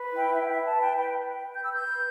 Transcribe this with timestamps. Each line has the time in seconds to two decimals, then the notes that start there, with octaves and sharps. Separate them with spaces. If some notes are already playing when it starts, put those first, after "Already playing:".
Already playing: B4
0.12 E4 G5
0.33 E4 E5
0.42 G5
0.49 E5
0.55 B4
0.65 A5
0.76 B4
0.82 G5
0.97 B4 G5
1.18 B4
1.29 G5
1.40 B4
1.54 G6
1.61 B4 E6
1.72 G6
1.82 B4